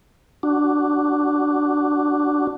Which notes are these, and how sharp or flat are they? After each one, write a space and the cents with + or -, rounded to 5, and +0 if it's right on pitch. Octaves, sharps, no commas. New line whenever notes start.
D4 +0 F#4 +5